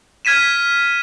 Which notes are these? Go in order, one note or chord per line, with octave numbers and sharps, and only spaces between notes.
F6 G#6 B6 D#7 E7